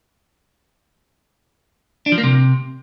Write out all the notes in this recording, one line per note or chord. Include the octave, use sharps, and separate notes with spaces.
D4
F3
A#3
C3